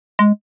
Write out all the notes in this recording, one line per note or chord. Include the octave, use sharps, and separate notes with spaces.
G#3